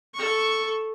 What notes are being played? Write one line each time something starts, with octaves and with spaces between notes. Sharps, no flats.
A4 C#6